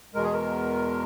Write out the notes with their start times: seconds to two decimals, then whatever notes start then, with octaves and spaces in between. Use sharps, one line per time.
0.14 E2 B2 G#3 A#4
0.24 G#4
0.33 A#4